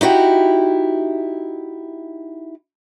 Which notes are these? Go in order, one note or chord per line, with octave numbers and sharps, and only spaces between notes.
D#4 E4 F#4 G4